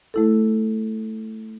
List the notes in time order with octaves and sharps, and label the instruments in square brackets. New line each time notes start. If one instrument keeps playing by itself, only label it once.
[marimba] A3 E4 A4